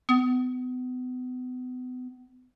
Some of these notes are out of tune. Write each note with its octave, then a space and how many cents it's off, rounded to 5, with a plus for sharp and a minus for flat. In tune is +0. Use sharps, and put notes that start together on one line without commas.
B3 +35